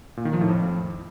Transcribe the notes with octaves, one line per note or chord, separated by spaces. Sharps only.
A#2
D#3
F3
A2
F2